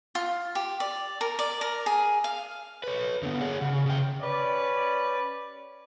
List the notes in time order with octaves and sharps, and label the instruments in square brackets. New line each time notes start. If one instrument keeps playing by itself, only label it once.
[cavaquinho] F4
G4
D5
A#4
D5
A#4
G#4
F5
[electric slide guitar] B4 C#5
D3 B3
G#4 C#5 F#5
C#3
C#3 G5
[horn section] C#4 G4 B4 D5